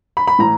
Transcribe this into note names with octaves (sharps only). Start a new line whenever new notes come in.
B5
B5
A2 E3 A#5